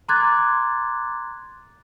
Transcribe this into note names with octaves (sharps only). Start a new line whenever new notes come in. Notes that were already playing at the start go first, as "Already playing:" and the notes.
A#5 C6 D6 F#6 G#6 A6